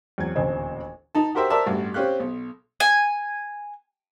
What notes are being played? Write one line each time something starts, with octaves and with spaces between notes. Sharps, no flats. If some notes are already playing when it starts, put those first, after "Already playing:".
E2 F#3 C4 G#6
D#1 A1 D2 C4 C5
D#4 A5
F#4 G4 A#4 C5 E5 G5
A#4 C5 D5 E5 A5
A1 G2 F#4
C4 C#4 G4 F5 F#6
B1
G#5